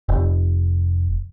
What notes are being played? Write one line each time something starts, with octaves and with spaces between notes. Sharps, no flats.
F1